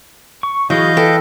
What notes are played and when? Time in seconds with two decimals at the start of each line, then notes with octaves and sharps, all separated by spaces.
0.43 C#6
0.70 E3 F#3 F#4 G#4 D#5 F5 G6
0.97 A4 B4 G5